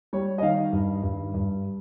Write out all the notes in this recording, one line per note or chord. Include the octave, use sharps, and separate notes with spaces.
G3 C#5
D#5
D#3 F5
G2
G2
G2